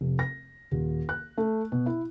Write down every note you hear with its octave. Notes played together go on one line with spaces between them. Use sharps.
F1
A#6
D#1
F#6
A3
B2
E4